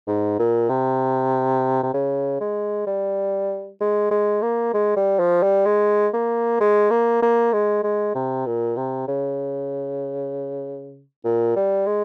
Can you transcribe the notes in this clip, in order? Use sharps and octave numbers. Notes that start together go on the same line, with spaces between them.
G#2
A#2
C3
C3
C#3
G#3
G3
G#3
G#3
A#3
G#3
G3
F3
G3
G#3
A#3
G#3
A#3
A#3
G#3
G#3
C3
A#2
C3
C#3
A#2
G3
G#3